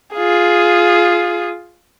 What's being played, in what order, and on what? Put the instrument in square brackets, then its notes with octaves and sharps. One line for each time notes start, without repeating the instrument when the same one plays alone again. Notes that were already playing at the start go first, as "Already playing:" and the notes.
[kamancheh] F4 G#4